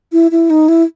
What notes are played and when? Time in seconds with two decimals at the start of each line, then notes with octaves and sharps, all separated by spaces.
0.12 E4
0.31 E4
0.50 D#4
0.68 E4